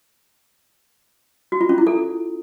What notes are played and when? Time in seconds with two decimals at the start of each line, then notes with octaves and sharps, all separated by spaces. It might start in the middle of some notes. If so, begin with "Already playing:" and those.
1.52 F#4
1.61 F4
1.69 C#4
1.78 E4
1.87 A4